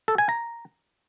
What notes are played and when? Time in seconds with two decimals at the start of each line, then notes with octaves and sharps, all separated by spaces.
0.08 A4
0.18 G#5
0.29 A#5